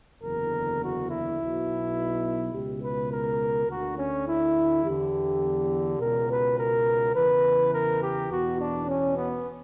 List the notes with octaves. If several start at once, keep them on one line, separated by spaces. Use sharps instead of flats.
F#1 E2 D3 A#4
F#4
E4
B1 B2
C#2 B2 G4
B4
A#4
D2 D3 F#4
C#4
E4
E2 D3 G4
C#2 B2 A#4
B4
A#4
E2 C#3 E3 B4
A#4
G4
E2 B2 F#4
D4
C#4
B3